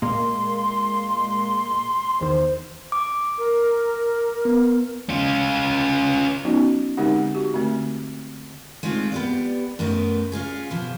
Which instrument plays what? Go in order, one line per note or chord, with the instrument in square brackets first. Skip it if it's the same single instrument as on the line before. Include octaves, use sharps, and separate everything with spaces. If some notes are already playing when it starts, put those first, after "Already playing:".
[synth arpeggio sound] A#2 G#3 A#3 [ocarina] C6
[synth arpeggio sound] E2 D#3 [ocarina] C5
[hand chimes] D6
[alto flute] A#4
[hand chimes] B3
[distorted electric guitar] C#4 F4
[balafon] F#3 B3 C#4 D#4 F#4
D3 G#3 C4 D#4 G4 F#5
F#4 G4
D3 A3 C4
[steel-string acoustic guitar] G#3 A3 C4 D#4 F4
B3 G4 D5
F#2 A3 B3 D#4 A#4
C#4 D#4 F4 G#4
B2 E3 F3